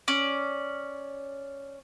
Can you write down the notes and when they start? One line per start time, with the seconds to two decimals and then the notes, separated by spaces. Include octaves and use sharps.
0.08 C#4 D5